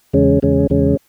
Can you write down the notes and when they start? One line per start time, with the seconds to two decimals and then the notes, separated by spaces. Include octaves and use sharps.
0.13 E2 C#3 G#3 C#4
0.42 E2 C#3 G#3 C#4
0.70 E2 C#3 G#3 C#4